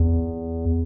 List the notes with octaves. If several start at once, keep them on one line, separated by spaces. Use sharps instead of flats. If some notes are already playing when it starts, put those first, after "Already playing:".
Already playing: E2